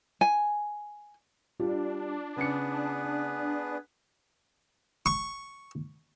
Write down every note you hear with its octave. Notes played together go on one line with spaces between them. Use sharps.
G#5
G3 D4 F4
C#3 B3 G#4 B4 C#7
C#6